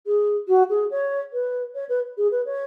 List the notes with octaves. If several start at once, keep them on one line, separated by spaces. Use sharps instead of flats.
G#4
F#4
G#4
C#5
B4
C#5
B4
G#4
B4
C#5